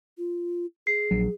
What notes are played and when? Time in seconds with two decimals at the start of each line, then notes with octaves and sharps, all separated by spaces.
0.18 F4
0.87 G#4 C7
1.11 A#1 F#3